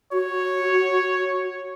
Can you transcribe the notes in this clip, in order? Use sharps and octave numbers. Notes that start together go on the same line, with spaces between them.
F#4 C#5